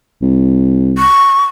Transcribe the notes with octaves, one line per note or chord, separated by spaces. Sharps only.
C2
C#6